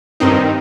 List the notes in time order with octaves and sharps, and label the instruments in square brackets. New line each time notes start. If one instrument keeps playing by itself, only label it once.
[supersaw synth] G2 D#3 C4 D#4